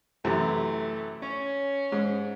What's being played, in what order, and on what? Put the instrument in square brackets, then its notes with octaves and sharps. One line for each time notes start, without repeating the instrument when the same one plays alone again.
[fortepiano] F#2 C3 E3 [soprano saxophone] A3
[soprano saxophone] C#4 [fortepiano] C#5
[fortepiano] G#2